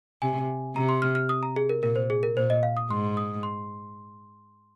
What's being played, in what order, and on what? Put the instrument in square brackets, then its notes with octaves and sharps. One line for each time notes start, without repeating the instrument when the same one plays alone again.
[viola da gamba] C3 [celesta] G#5
[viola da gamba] C3 [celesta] A#5
[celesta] C6
F6
F6
D#6
A#5
G#4
A#4
[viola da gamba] A#2 [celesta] A#4
[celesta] C5
G#4
A#4
[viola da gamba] A#2 [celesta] C5
[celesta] D#5
F5
D#6
[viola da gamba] G#2 [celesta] C6
[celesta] D#6
C6